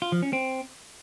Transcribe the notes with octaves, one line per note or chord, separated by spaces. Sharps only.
F4
F3
C#4
C4